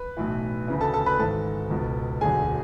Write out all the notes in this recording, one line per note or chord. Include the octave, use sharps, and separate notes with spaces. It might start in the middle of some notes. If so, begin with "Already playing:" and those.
Already playing: B4
B1 A2 E3
D2 C#3 E3
A4 A5
A4 A5
B4 B5
G#1 G#2 E3 A4 A5
C#2 B2
E1 D2 D3 G#4 G#5